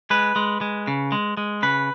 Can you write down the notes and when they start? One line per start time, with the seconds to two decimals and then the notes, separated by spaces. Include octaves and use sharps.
0.10 G#3 B4
0.36 G#3
0.61 G#3
0.87 C#3
1.12 G#3
1.37 G#3
1.63 C#3 B4